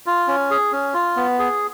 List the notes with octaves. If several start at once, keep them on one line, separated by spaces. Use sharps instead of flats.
F4
C#4
G#4
C#4
F4
B3
G#4